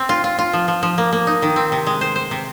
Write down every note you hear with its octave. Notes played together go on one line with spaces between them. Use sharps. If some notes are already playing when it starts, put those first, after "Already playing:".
Already playing: C4
F4
F4
F4
F3
F3
F3
A#3
A#3
D#4
D#3
C4
C3
G#3
C5
C5
C3